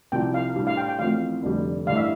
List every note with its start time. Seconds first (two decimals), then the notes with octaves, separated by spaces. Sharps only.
0.12 C2 C3 F3 G5
0.34 F5
0.56 A2 G3 D4
0.67 F5
0.77 G5
0.89 G5
0.99 A1 A2 F3 C4 F4 F5
1.43 F1 F2 D3 G3
1.87 A1 G2 E3 F5
1.96 E5